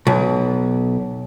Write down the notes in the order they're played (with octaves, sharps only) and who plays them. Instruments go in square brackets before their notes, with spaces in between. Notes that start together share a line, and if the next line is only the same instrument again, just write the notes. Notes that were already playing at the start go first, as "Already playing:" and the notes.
[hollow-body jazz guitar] B1